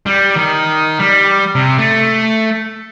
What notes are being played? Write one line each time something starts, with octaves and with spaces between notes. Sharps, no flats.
G3
D#3
G3
C3
A3